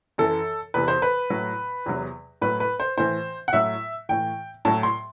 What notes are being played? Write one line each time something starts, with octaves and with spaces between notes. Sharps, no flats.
F#2 E3 A4
E2 C3 E3 B4
C5
B4
A2 F#3
E2 C3 F#3
A2 F#3 B4
B4
C5
A2 E3 C5
F#5
A2 F#3 E5
A2 E3 G5
A2 F#3 A5
C6